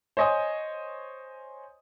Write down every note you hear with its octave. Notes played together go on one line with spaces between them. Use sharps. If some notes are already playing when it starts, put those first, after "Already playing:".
C5 C#5 D#5 G#5 D#6